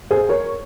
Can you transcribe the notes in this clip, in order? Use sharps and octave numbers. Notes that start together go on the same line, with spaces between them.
G#4 C5
A#4 C#5